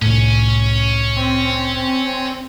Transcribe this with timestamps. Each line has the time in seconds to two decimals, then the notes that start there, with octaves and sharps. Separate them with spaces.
0.02 C2 A2 C#4
1.17 C4